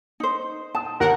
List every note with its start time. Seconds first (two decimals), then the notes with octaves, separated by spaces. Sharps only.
0.20 D#4 C5
0.75 G5 A5 D#6
1.00 D#2 A#4 F#5